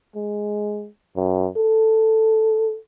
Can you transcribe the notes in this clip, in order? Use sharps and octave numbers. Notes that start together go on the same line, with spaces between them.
G#3
F#2
A4